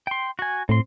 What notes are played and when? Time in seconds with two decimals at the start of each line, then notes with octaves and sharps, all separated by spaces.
0.07 G5 C6
0.39 F#4 G#5
0.69 A2 C4 C6